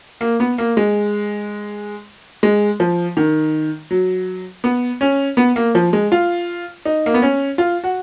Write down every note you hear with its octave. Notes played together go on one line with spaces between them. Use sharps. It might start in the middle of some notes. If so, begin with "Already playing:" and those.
A#3
B3
A#3
G#3
G#3
F3
D#3
F#3
B3
C#4
B3
A#3
F3
G#3
F4
D#4
A#3
B3
C#4
F4
F#4